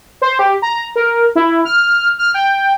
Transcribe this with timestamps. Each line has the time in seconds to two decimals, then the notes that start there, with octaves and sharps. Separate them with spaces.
0.22 C5
0.39 G4
0.62 A#5
0.96 A#4
1.35 E4
1.65 F6
2.19 F6
2.34 G5